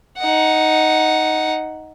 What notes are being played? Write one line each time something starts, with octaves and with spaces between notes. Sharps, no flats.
D#4 F#5